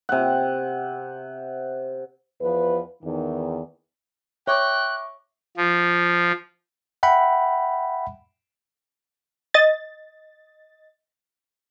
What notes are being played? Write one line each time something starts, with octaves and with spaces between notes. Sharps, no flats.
C3 F#5
E2 F3 B4
E2 D#3
C#5 E5 G5 C#6 D6 F#6
F3
E5 F#5 G5 B5
D#5 A6